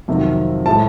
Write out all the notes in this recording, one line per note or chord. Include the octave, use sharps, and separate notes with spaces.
F2 C3 D#3 F#3
A2 E3 G#3 A5